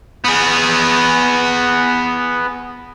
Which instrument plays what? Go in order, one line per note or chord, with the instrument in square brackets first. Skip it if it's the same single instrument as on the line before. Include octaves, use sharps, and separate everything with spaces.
[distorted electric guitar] B3 G#4